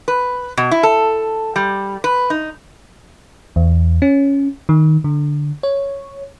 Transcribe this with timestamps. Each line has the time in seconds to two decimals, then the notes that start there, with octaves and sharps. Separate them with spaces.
0.08 B4
0.57 B2
0.71 E4
0.83 A4
1.56 G3
2.04 B4
2.30 D#4
3.56 E2
4.02 C#4
4.69 D#3
5.04 D3
5.63 C#5